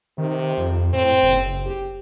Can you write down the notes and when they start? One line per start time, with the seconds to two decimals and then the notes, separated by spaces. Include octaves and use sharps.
0.18 C3 D#3
0.58 F2
0.93 A2 C4
1.23 F#1
1.66 G4